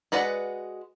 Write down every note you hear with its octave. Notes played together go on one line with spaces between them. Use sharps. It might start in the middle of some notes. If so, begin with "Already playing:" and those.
G#3 F#4 B4 D5 F#5